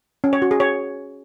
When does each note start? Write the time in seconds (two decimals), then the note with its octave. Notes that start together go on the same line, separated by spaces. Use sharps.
0.24 C#4
0.33 C#5
0.42 F#4
0.51 G#4
0.60 C#5